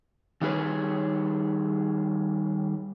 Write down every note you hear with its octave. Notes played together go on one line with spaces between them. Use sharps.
D#3 G3 D4 G#4 B4 C#5